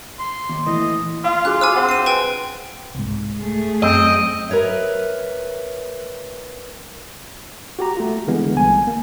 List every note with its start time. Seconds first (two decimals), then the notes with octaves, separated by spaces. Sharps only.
0.19 C6
0.49 D#2
0.66 A#2 E3 A3 D#5
1.24 F4 F5 E6
1.45 D4 F#4 G#4 F#6
1.61 C5 G#5 B5 D6 E6
1.76 C4 G#4 C5 F#5
1.89 C7 D#7
2.06 B4 G5 G#5
2.95 C2 G#2
3.37 A3 G#4
3.83 F#2 C4 D#5
4.50 A#4 B4 C#5 E5
7.79 F#4 G4 A#5
7.97 A3 F4
8.27 D3 E3 G#3 B3
8.54 C2 G#5
8.87 A#3